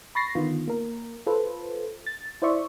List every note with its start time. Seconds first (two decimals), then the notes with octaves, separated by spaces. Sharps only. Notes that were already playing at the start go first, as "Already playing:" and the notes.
0.15 B5 C#6 A6 A#6 C7
0.35 D3 D#3 B3 F4
0.67 A#3 A#4
1.27 F4 A4 B4 C5
2.06 A6
2.42 E4 C5 D5 E5 C#6